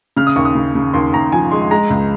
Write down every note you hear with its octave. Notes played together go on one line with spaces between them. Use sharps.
C#3 F6
D#6
D#2 C#6
D#6
C#3
C#3
D#2 C6
D#2 A#5
F3 G#5
G#3 C6
C6
G#3 A#5
C#2